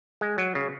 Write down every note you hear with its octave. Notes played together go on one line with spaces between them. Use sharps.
G#3
F#3
C#3